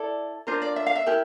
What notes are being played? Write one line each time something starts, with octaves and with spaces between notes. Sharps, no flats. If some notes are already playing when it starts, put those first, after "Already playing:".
Already playing: E4 A4 D5
D4 F4 A#4 C5
D5
E5
F5
E5
E4 G4 A#4